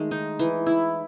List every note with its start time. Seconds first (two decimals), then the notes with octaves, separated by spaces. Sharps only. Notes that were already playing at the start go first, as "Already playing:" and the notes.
Already playing: D#3 G#3 A3
0.11 D#4
0.39 E3
0.66 E4